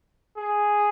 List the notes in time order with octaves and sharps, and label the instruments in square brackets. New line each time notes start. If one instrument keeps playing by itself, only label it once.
[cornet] G#4